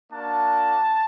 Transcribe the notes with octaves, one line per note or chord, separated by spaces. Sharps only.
A#3 D4 F#4 A5